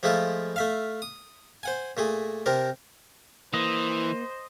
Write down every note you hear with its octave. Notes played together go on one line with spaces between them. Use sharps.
F3 G#3 A3 E4 F4
A3 E5 F5
D#6
C5 F#5 G#5
A#2 A3 G#4
C3 C4 D4 A#4
E3 A#3 C5 D#5